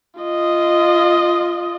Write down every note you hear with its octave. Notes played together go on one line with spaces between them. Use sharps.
F4 D#5